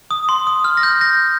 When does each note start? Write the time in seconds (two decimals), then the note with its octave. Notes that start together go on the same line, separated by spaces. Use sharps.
0.11 D#6
0.29 C6
0.47 D#6
0.64 F6
0.77 A#6
0.83 G6
1.01 A#6